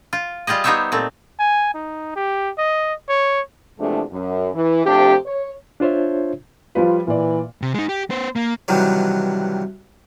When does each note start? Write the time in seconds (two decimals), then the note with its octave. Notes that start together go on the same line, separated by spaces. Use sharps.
0.13 F4
0.47 G3 F4 G4 G#4 D#5
0.64 B3 D#4 G4 C5 C#5 E5
0.92 A#2 A3 C4
1.39 G#5
1.75 D#4
2.16 G4
2.58 D#5
3.09 C#5
3.79 E2 C3 F3 G#3 A3 D4
4.11 F#2
4.54 E3
4.85 C3 F3 A3 D4 G4
5.26 C#5
5.80 D4 F4 C5 C#5 E5
6.75 F3 G3 F4 B4
7.07 A#2 E3 D5
7.62 C3
7.74 G#3 D#4
7.89 G4
8.10 B3 C5
8.36 A#3
8.68 G2 C3 D#3 E3 F#3